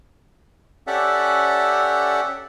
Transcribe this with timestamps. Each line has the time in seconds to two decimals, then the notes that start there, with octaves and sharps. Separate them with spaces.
0.87 C#4 G4 A4 D5 E5 F#5